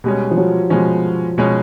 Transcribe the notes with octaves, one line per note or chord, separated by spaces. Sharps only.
B2 G3 G#3 C#4
F3
F#3
B2 F3 G#3 C#4
B2 G#3 C#4